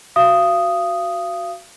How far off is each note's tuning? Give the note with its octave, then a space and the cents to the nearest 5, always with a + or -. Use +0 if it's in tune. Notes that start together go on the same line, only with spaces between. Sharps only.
F#4 +0 F5 -30 D#6 +0